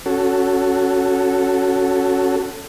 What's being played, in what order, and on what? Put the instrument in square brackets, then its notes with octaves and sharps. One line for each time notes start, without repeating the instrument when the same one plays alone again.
[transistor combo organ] C#4 F#4 A4